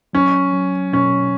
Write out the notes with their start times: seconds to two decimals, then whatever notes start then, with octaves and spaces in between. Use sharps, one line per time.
0.13 F#3 C#4
0.53 F#3
0.93 B2 C#4